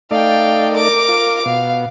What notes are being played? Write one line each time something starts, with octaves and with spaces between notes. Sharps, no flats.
A3 D#4 D5 F5 G5
A#4 D6
F4
B2 F5